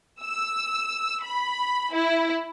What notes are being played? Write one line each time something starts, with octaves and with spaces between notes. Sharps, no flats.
E6
B5
E4